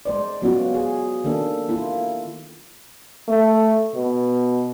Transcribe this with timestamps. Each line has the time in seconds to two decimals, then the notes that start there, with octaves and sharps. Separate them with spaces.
0.05 G#3 C5 D5
0.42 F#3 B3 C#4 F4 F#4
0.74 G#4
1.24 D#3 A#3 D4 A4
1.68 A#3 E4 F4
3.28 A3
3.94 B2